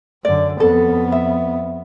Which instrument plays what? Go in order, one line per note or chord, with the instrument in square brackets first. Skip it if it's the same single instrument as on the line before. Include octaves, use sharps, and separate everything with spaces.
[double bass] F#2 D3 [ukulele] D5
[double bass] F2 B3 [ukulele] A4
[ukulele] E5